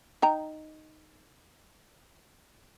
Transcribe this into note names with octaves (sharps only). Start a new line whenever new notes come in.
D#4 G5 A#5